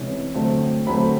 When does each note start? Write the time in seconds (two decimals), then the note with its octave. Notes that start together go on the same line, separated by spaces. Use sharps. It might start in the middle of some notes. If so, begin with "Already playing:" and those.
Already playing: C3 E3 G#3 C#4
0.34 D3 F#3 A3 C4
0.87 D3 F#3 A3 C4 B5